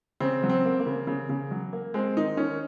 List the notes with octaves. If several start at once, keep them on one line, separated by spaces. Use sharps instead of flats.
C#3 C4
F#3
C4
A#3
A#3
C#3
C#3
C#3
F#3
A#3
G#3 C4
D#3 D#4
D#3 C#4